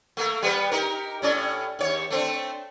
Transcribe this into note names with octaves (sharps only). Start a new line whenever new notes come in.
A3 A#3
G3 B3 B4
D#4 G4 A#4
A2 C#4 D5
D#2 C#5
A3 C4 D4